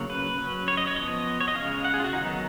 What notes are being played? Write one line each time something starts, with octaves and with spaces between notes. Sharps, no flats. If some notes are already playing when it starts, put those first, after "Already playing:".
Already playing: C#3 F#3 A#3 C#4
B4
F#3 C#4
C#5
D#5
C#5
F3 B3 D#5
C#5
D#5
C#3 G#3 C#4 F5
F#5
G#4
F4
F#4
D#3 F#3 B3 D#4